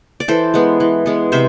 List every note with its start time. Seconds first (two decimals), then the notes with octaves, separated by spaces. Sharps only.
0.20 D5
0.28 E3 A4 C5
0.54 G#3 B3
0.80 E3
1.06 G#3 B3
1.32 C3 C5 E5